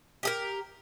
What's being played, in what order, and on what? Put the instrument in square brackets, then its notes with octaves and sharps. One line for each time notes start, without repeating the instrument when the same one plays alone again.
[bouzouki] G4 G#4 A#4